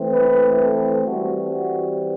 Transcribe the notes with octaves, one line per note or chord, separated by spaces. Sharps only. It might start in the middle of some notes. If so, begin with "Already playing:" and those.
Already playing: E3 A3 C4
B4
A4
E3 G3 C4 F#4
F#4